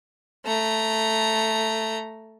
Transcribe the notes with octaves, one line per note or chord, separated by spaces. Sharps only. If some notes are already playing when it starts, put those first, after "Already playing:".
A3 A#5